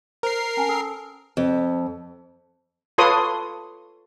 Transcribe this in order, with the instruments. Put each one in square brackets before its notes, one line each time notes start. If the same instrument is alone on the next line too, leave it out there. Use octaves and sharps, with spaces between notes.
[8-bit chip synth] A#4 C7 [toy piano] C5
[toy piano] C#4 G#5 A5
A4 E6
[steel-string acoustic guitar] F2
[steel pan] F4 A4 B4 C#5 C6 D#6